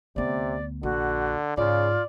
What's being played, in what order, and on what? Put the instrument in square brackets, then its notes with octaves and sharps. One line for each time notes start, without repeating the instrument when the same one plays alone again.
[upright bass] D2 B3 [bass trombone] C3 [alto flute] D5
[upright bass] A#1 [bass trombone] D3 [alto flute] F#4
[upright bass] G#2 [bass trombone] C#3 [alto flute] F4 [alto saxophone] D5